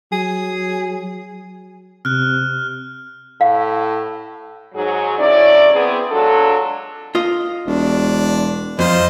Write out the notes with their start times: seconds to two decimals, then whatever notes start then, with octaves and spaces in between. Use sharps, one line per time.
0.12 F#3 G#4
2.05 C3 F6 F#6
3.41 A2 F5
4.74 G#2 F#3 G#4
5.18 D2 F#3 C#4 E4 D5
5.74 B3 C4 G#4
6.12 F#3 G#3 D4 F4 A4
7.15 F4 D#5
7.66 E1 D4
8.79 F2 F4 C5 D#5